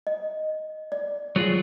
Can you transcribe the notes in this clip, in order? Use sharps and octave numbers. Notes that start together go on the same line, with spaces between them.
D#5
D5
F#3 F4 G#4